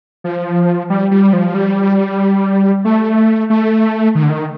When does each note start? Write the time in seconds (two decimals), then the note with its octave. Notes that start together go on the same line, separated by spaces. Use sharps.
0.24 F3
0.90 G3
1.11 G3
1.33 F3
1.54 G3
2.85 A3
3.50 A3
4.15 D#3
4.23 D3
4.30 D#3